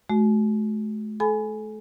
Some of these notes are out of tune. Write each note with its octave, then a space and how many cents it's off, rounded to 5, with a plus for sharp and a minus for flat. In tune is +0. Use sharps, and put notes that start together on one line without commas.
A3 -45 F#4 +10
A4 -35 G#5 +5 B5 +20